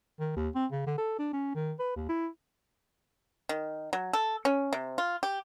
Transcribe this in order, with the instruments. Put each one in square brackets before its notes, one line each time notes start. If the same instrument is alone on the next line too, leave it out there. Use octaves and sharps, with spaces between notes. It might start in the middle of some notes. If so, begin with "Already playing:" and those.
[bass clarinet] D#3
D#2
C4
C#3
D3
A4
D4
C#4
D#3
B4
D#2
E4
[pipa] D#3
F#3
A4
C#4
C3
F4
G4